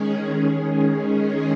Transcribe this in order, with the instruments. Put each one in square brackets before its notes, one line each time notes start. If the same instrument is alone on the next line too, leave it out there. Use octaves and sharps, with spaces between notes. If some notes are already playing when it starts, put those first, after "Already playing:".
Already playing: [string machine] D#3 G#3 C#4 G#4